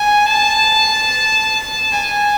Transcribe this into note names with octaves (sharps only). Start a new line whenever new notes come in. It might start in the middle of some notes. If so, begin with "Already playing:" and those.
Already playing: G#5
A5
G#5